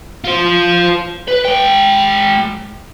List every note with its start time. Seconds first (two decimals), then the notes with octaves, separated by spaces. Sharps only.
0.24 F4 C5
1.28 B4
1.45 G#3 G5